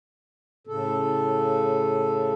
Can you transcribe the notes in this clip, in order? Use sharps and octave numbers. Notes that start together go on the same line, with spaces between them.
A2 C#3 A4